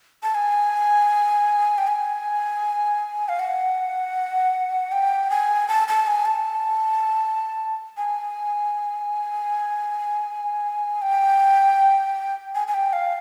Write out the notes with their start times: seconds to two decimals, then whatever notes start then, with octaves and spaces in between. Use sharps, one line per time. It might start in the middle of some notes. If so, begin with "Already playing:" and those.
0.23 A5
0.35 G#5
1.78 G5
1.87 G#5
3.29 F5
3.39 F#5
4.92 G5
5.30 G#5
5.68 A5
5.88 A5
6.07 G#5
6.26 A5
7.97 G#5
11.02 G5
12.55 G#5
12.68 G#5
12.74 G5
12.93 F5